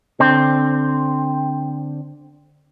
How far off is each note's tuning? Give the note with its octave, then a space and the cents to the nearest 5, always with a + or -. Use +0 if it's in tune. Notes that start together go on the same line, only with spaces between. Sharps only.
D3 +0 C4 +0